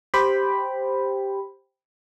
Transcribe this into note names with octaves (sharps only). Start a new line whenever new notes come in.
G4 C5 G5 B5